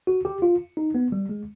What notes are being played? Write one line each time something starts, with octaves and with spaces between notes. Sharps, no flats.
F#4
G4
F4
D#4
B3
G3
G#3